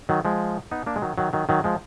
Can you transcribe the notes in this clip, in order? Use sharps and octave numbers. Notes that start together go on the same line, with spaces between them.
D#3 F#3
F3 G#3
B3 D#4
A#3 D4
G#3
D#3 F#3
D#3 F#3
D#3 F#3
D#3 F#3
F3 G#3